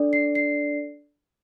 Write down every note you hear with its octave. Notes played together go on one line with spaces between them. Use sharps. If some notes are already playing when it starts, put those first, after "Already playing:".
Already playing: D4 A4 D5
C7
C7